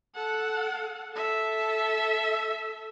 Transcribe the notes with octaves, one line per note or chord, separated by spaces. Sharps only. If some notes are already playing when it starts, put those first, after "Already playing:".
A4 F#5
A4 E5